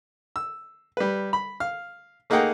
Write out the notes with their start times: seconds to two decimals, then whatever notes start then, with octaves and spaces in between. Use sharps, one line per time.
0.36 E6
0.97 G3 B4
1.33 B5
1.60 F5 F6
2.30 A3 A#3 D#4 G#4 F#5 G5